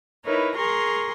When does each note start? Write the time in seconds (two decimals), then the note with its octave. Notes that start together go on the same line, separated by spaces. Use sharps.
0.24 D#4 E4 A#4 B4 C#5
0.55 G#4 A#4 A#5 C6 C#6